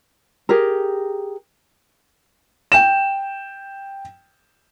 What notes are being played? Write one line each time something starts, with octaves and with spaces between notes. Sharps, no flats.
G4 G#4 A#4
G5 E7